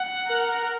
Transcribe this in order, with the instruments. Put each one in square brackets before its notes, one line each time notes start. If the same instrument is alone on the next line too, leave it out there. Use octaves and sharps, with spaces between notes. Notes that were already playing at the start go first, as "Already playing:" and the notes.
Already playing: [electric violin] F#5
[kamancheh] A#4